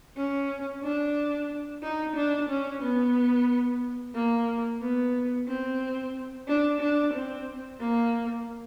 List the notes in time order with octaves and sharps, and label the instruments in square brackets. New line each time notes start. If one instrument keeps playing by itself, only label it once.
[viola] C#4
D4
D#4
D4
C#4
B3
A#3
B3
C4
D4
D4
C4
A#3